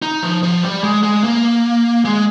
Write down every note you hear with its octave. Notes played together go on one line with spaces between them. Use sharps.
D#4
F3
F3
G3
G#3
G#3
A#3
G#3